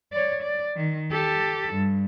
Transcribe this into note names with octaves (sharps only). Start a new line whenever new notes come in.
C#5 D5
D5
D#3
G4 A4
G2